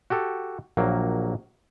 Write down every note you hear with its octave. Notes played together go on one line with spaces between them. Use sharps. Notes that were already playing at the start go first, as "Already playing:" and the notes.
F#4 G4 A4
A#1 F#3 A#3